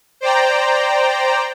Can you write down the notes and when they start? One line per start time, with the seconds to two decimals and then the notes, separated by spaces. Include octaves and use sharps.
0.21 C5 D5 G5 A#5